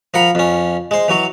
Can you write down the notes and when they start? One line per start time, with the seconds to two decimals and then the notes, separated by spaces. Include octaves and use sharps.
0.14 F3 A#4 F#5 B5
0.35 F2 C#4
0.91 G#3 C5
1.08 E3 F#3 F#4